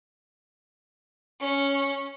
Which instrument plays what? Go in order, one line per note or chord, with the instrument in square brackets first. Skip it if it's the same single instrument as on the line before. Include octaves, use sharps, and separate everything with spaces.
[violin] C#4 C#6